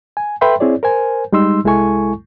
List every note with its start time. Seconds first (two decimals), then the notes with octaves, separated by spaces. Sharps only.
0.17 G#5
0.41 A4 B4 E5 G5 B5 C6
0.60 C4 E4 G#4 C#5 D5
0.83 A#4 C5 G#5
1.33 G3 G#3 D#4 C6 E6
1.64 C2 G#3 E4 A4 G#5 C#6